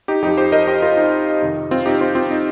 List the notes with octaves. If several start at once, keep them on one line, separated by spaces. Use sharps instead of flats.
D#4 G4
F2 F3 D#4 G4
G4 C5
A#4 D#5
G4 C5
F4 A#4
D#4
F2 C3 D#3
C4 F4
D#4 G4
C4 F4
C4 F4
D#4